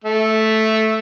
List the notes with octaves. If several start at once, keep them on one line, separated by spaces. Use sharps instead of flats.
A3